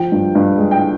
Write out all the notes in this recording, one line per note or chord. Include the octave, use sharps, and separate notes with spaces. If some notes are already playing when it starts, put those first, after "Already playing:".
Already playing: F3 G5
G2
G2
G#3
G5